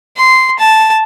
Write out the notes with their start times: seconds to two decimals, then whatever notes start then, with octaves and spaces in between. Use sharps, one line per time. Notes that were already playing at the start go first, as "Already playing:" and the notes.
0.17 C6
0.59 A5